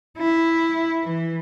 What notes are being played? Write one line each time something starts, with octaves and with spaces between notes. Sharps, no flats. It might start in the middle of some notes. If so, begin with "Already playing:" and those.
E4
E3